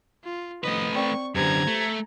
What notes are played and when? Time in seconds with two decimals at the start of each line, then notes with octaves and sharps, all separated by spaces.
0.24 F4
0.64 C2 F2 D#3 A3 B4 D#5
0.95 C4 D5 G5 C#6
1.35 F#2 D3 G4 B4 C5 A#5 G#6
1.68 A3